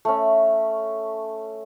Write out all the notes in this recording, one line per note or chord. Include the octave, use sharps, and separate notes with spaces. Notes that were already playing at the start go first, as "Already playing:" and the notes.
A3 C#4